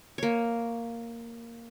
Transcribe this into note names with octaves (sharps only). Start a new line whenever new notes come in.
A#3 C#5